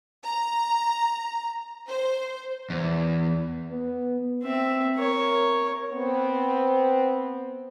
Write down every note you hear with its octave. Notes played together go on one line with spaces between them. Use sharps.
A#5
C5
E2
B3
C4 E5
A#4 C#5
B3 C4